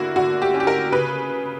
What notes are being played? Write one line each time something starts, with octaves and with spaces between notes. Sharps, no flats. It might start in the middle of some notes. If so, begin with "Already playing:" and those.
Already playing: D3 A#3 E4 F#4
D3 F#4
G4
C#4
G4
A#4
C#3 B4